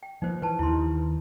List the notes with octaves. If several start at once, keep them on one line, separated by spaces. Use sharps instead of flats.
G5
F3 A#3 D#4 B4 C5
E3 B4 A5
D#2 D#3 E4 C6
B4